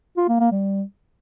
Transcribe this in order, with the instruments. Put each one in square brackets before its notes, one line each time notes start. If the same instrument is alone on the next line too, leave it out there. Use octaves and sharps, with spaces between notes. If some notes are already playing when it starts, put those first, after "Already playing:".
[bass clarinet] F4
A#3
A#3
G3